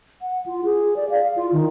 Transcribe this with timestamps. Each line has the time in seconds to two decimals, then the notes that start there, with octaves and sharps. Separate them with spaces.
0.22 F#5
0.46 F4
0.65 G#4
0.96 D5
1.10 F5
1.36 F4
1.52 D#3